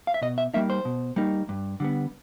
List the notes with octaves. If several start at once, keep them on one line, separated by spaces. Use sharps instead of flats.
F5
E5
B2 D#5
E5
G3 A#3 D#4 E5
C5
B2
G3 A#3 D#4
G2
D3 G3 B3